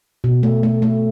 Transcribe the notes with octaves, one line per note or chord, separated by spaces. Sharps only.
B2
A3
A3
A3